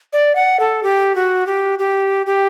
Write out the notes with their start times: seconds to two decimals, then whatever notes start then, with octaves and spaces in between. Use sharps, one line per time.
0.13 D5
0.35 F#5
0.59 A4
0.83 G4
1.15 F#4
1.46 G4
1.79 G4
2.26 G4